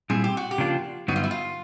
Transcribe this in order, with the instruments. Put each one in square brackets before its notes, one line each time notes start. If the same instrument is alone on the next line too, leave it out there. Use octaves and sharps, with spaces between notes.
[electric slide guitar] A#2 G3 C4 E4 [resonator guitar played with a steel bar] G#4
[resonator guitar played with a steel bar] G4
F#4
G4
[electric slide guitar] C#3 F3 A#3 D4 F4
[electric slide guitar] G2 D3 F#3 B3 D#4 [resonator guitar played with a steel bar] F#4
[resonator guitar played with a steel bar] F4
E4
F4